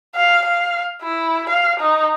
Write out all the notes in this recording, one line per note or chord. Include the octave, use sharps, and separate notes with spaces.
F5
F5
E4
F5
D#4